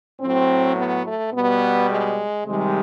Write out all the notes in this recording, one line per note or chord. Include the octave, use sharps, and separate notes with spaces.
A2 F#3 C4
B3
A3
B2 G3 B3
G#3
C3 D#3 G3 G#3